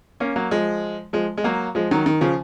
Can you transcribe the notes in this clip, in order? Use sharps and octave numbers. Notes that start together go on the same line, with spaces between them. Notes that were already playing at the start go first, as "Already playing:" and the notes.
A#3 C#4
F#3 A#3
F3 G#3
F3 G#3
G#3
F#3 A#3
F3 G#3
D#3 F#3
D#3
C#3 F3